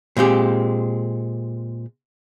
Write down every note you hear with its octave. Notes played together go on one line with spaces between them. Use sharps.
A#2 G#3 C4 G4